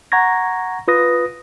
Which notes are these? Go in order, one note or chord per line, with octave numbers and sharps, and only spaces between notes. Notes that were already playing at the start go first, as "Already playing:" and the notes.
F#5 A#5 C#6 G#6 A#6
F4 B4 D#6 A#6